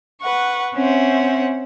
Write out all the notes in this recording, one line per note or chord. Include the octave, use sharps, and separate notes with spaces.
B4 F#5 C#6
C4 C#4 C5 E5 F#5